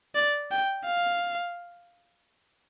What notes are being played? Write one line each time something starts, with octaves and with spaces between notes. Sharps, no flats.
D5
G5
F5